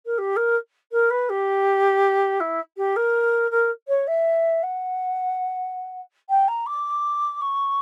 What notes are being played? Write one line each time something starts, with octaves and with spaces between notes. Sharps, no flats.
A#4
G4
A#4
A#4
B4
G4
E4
G4
A#4
A#4
C#5
E5
F#5
G5
A#5
D6
C#6